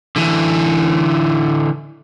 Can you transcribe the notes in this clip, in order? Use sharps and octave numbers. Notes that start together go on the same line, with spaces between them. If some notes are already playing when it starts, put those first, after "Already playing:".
D3 E3